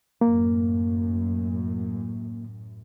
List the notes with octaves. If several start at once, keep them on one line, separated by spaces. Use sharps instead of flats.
F#2 A2 A#3